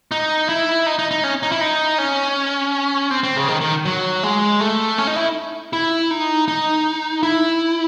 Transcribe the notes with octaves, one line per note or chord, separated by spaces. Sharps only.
D#4
E4
D#4
D#4
D#4
C#4
D#4
E4
D#4
C#4
C4
C4
C#3
D#3
D#3
F#3
G#3
A3
C#4
D#4
E4
E4
D#4
D#4
E4